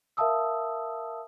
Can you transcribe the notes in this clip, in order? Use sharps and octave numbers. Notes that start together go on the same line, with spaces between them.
A#4 E5 F5 A5 D#6 E6